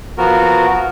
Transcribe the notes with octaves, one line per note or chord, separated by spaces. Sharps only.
F3 B3 F#4 A#4